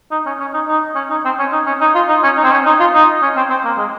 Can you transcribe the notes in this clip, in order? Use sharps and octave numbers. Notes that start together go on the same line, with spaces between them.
D#4
C#4
C#4
D#4
D#4
C#4
D#4
C4
C#4
D#4
C#4
D#4
F4
D#4
C#4
D#4
C4
C#4
D#4
F4
D#4
C#4
C4
C4
A#3
G#3